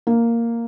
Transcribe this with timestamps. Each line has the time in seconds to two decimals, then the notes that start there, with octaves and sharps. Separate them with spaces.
0.07 A#3